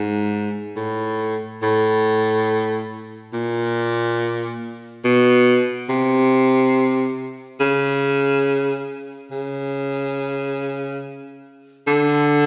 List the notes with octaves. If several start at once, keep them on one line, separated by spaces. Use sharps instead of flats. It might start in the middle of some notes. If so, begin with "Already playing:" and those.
Already playing: G#2
A2
A2
A#2
B2
C3
C#3
C#3
D3